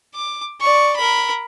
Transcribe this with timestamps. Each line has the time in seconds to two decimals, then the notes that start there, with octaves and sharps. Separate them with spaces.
0.15 D6
0.61 D5 C#6
0.96 A#4 B5